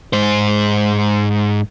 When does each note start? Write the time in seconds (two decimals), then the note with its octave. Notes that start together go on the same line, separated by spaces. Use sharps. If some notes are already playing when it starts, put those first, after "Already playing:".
0.13 G#2 C5